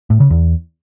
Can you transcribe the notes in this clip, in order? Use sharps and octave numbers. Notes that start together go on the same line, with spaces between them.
A2
C#3
E2